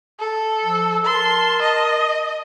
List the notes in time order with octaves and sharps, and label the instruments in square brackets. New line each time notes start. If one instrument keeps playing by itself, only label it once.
[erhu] A4
[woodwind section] F3 E6
[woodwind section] A#4 A5 [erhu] C6
[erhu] D#5